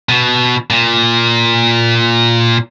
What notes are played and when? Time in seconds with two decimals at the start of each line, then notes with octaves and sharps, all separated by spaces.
0.09 B2
0.70 A#2